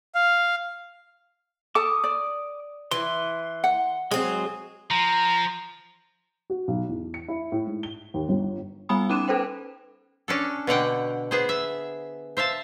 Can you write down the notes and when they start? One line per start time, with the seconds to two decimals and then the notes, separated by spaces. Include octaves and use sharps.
0.15 F5
1.75 A4 A5 D6 D#6
2.04 D5
2.91 E3 C6
3.64 F#5
4.11 F#3 G#3 C4 G#4
4.91 F3 A#5
6.50 F#4
6.68 B1
6.89 E2
7.14 C#7
7.28 E4
7.52 A2
7.67 G#2
7.83 G7
8.14 D#2
8.29 G1
8.89 G3 B3 G#5 B5 D#6
9.09 C#4 D#4 D6 F#6 D#7 E7
9.28 A4 B4 C5 G5
10.28 C#4 D4 A4
10.67 B2 D3 F#5 G5
11.31 B3 G#4 C5
11.49 E5
12.37 C5 E5 F5 A5